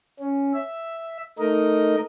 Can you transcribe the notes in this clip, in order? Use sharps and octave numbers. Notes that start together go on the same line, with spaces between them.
C#4
E5
A3 D#4 A#4 D#5